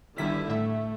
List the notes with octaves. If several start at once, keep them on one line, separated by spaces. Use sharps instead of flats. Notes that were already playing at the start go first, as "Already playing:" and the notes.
G1 D3 D#3 G3 E4 B6
A2 A3 E5